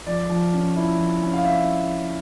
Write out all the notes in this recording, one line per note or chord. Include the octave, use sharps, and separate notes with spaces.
F3 D5
F3
C#4
E4
F3
C#4
F5
E4 E5